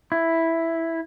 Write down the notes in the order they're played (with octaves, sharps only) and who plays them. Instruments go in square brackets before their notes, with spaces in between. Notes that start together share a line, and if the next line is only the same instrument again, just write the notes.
[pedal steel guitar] E4